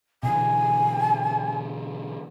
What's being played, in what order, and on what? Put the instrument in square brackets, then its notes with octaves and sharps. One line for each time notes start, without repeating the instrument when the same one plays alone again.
[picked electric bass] B2 D3 E3 [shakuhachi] G#5